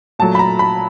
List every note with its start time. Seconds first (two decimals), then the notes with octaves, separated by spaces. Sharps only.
0.19 A#2 F#3 A3 A5
0.35 B5
0.39 A#5
0.59 B5